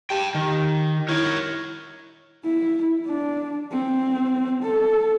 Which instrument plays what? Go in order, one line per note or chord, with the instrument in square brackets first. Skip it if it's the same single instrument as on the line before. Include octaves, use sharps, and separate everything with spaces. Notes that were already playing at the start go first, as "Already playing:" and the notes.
[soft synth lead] G4 [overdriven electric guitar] G5 A5
[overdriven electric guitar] D#3
[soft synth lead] E4 [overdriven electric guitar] A#4 C#5
[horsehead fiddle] E4
D4
C4
A4